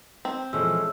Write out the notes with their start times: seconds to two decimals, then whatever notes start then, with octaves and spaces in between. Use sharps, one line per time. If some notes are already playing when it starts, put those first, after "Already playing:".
0.25 C4
0.53 A#2 E3 F3 G#3 A3 C#4 E6